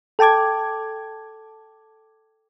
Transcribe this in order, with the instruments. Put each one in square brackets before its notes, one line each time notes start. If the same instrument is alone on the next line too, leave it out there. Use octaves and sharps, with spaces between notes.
[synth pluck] A4 G5 A5 D6 G#6